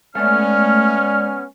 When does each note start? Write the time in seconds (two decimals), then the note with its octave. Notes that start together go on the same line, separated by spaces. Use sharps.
0.15 G#3 A3 B3 C#4 D5 F6